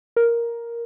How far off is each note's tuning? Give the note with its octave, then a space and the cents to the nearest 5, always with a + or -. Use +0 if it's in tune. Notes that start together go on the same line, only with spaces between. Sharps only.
A#4 +5